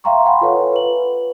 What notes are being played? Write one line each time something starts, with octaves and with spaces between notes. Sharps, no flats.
E5 F5 G5 A#5 C6 C#6
F5 F#5 G#5 B5 C6
F4 A4 B4 C#5 F#5
B4 F#7